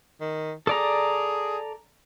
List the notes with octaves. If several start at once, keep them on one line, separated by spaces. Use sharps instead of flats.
D#3
G#4 A4 D5 A#5